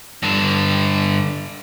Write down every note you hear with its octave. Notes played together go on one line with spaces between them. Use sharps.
G2 D3